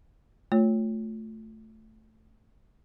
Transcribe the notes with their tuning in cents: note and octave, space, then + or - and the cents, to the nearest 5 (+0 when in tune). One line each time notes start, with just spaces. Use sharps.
A3 +0 F4 +20 C#5 +0